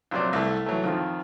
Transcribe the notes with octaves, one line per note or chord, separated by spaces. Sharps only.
A#1 C3 F#3 C5 D5
C2 A3
E3 F#3 A3
F2 D#3 F3